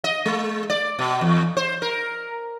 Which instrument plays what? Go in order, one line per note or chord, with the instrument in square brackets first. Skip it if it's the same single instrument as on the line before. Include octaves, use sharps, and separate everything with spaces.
[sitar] D#5
G#3
D5
B2
E2
C5
A#4